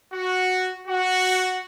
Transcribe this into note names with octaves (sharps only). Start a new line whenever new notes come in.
F#4
F#4